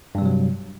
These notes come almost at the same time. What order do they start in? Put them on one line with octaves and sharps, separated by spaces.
G2 G3 C3 F#3